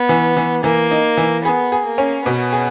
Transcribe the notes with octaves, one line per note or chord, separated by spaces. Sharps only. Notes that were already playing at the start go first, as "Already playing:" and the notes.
Already playing: B3
E3
E3
E3 A#3
D#4
E3
B3 G#4
G#4
A#3
C#4
B2 B3
G#4